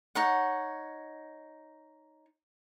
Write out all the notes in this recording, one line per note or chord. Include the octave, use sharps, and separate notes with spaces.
D#4 C#5 F#5